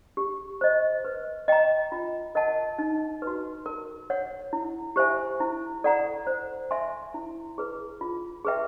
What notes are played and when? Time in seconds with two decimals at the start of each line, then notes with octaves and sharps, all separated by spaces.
0.17 G4
0.61 C5 D#5
1.05 B4
1.48 D#5 G5 A#5
1.92 F4
2.35 A#4 D#5 F#5 A5
2.79 D#4
3.22 B4
3.27 F#4
3.66 A#4
4.10 C#5 F#5
4.53 E4
4.96 G4 C5 E5 G#5
5.40 E4
5.84 A4 D5 F#5 A#5
6.27 C5
6.71 E5 G#5 C6
7.14 E4
7.58 G#4 B4
8.01 F4
8.45 G#4 B4 E5 G5